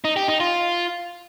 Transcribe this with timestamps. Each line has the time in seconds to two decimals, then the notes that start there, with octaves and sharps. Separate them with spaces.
0.04 D#4
0.16 G4
0.28 D#4
0.40 F4